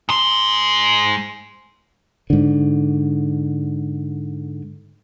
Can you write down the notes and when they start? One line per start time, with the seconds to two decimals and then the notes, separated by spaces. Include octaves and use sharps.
0.09 G#2 C6
2.30 G#2 D3